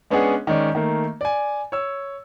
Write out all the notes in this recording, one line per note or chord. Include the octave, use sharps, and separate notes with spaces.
G#3 B3 C#4 D4 G#4 F#5
D#3 G#3 C#4 D5
D#3 A3 A#3
D5 G#5
C#5 E6